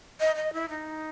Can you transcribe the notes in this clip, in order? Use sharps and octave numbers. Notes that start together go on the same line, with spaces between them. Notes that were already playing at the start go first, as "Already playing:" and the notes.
D#5
D#5
E4
D#4